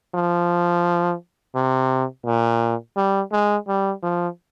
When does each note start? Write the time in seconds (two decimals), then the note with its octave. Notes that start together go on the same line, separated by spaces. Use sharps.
0.15 F3
1.55 C3
2.26 A#2
2.97 G3
3.32 G#3
3.68 G3
4.03 F3